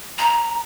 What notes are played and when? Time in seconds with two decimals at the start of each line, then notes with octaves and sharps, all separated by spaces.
0.18 A#5